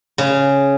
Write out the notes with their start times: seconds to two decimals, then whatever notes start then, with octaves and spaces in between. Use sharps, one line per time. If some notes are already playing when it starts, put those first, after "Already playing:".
0.18 C#3